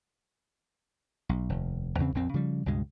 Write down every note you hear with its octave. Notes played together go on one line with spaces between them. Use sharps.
B1
F1 D#2
E2 C#3 C4
A#1 F2 C4
C#3 F3 G3
C#2 G2 B2 G#3